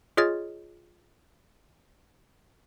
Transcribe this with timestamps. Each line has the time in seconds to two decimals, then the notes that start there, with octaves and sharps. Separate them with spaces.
0.17 F4 G#4 C#5 D#5 F6 A6